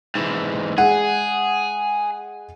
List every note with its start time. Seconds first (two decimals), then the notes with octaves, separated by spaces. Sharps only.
0.15 G#2 E3
0.78 G#3 G#4 F#5